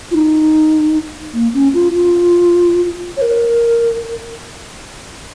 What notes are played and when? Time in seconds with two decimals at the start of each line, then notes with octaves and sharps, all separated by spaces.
0.11 F4
0.15 D#4
1.34 A#3
1.54 C#4
1.74 F4
1.94 F4
3.17 C#5
3.22 A#4